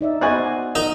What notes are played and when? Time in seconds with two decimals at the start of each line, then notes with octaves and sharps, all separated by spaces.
0.01 D#4 D5 E5
0.21 B3 F#4 C5 D5 D#5 G#5 F#6
0.75 D#4 A#4